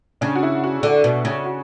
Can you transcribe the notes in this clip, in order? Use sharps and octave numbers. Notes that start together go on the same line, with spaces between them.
C#3 D4
F#4
E4
F#4
D3
B2
C#3
F#4